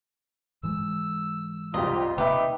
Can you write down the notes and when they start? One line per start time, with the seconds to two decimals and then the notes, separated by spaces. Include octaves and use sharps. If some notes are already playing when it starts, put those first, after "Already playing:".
0.63 G#2 E3 G#3 E6
1.74 C2 F2 F4 G4 D#5
2.18 C3 A#3 D#4 G4 B4 E5